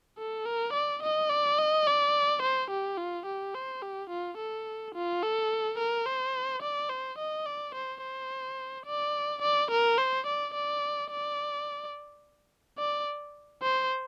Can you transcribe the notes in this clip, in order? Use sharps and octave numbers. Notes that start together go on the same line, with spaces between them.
A4
A#4
D5
D#5
D5
D#5
D5
C5
G4
F4
G4
C5
G4
F4
A4
F4
A4
A#4
C5
D5
C5
D#5
D5
C5
C5
D5
D5
A#4
C5
D5
D5
D5
D5
C5